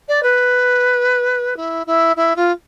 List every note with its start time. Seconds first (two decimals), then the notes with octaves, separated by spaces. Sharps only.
0.08 D5
0.23 B4
1.57 E4
1.87 E4
2.16 E4
2.36 F4